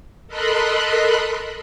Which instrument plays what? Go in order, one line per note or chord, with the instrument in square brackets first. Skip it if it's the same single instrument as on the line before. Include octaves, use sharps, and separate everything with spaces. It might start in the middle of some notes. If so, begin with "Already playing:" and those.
[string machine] A4 A#4 D#5 B5 C6 F#6